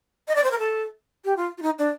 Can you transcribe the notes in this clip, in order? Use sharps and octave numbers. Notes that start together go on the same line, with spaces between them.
D#5
D5
C5
A#4
A4
G4
F4
F4
D#4
D4